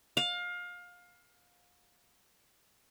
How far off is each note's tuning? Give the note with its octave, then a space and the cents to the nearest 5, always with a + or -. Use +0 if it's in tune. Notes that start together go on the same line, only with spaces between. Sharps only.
F5 +25